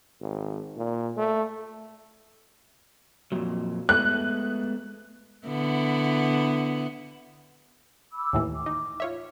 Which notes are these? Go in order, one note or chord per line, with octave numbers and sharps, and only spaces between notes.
G#1
A#2
A3
F2 A#2 F#3
G#3 A3 B3 F#6
D3 B3 E4
B5 D6 E6
D#2 A2 E3
D6
D#4
F4 C#5 E5